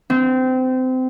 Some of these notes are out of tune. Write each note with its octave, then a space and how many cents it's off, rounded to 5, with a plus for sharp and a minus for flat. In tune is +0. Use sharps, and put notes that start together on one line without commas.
C4 -25